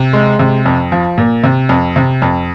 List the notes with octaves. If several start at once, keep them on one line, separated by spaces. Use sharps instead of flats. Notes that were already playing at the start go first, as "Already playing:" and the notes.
Already playing: C3
G#3
C3
F2
F3
A#2
C3
F2
C3
F2